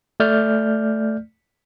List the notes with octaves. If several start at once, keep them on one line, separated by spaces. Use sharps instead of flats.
A3 D5 F6 G6